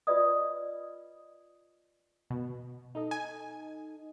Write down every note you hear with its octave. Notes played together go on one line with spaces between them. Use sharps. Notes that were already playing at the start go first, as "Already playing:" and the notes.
F4 B4 D5 D#5 D#6
B2
D#4 A4 D#5
G#5